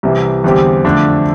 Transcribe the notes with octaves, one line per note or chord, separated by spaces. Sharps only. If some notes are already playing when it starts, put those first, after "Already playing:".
C2 C3 E3
E2 D3 G3 C4 G4
F2 D3 A3 D4